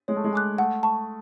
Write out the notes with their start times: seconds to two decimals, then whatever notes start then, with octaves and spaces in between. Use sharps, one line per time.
0.08 G#3 C#5
0.16 A3
0.24 G#3
0.33 G#5 D6 F#6
0.58 A3 F#5
0.83 A5 C#6